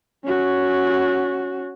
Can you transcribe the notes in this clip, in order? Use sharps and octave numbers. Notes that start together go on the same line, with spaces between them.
C#4 F#4